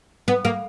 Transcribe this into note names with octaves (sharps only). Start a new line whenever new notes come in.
B3
A#3